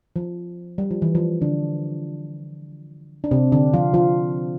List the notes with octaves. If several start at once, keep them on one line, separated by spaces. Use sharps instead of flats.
F3
G3
F3
E3
F3
D3 D4
D4
C3 C4
D3 D4
F3 F4
F3 F4